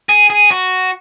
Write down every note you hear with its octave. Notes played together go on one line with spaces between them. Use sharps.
G#4
G#4
F#4